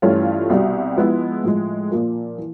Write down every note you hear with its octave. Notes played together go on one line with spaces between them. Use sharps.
G2 E3 A3 C#4 F4
C2 B2 G3
F3 G#3 B3 E4
A2 F3 G#3
A#2 F3 A#3
E3